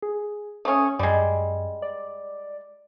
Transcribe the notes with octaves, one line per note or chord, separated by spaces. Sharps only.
G#4
A3 C#4 D#6
F#2 G3 G#3
D5